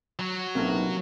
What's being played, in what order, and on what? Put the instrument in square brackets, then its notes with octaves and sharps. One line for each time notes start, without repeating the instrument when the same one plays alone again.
[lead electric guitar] F#3 F#4
[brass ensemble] B1 A2 [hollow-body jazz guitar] C3 A#3 C#4